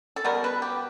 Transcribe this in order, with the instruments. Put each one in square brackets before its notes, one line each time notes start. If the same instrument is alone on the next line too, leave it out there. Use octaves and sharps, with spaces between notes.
[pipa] A4
B2 G3 B3 A#4
B4
G4